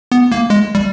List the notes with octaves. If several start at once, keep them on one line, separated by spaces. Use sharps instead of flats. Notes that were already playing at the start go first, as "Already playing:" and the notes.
B3
A#3
G#3
G3